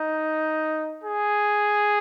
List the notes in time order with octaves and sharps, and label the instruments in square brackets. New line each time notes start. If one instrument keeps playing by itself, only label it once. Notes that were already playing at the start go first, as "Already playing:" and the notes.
Already playing: [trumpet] D#4
G#4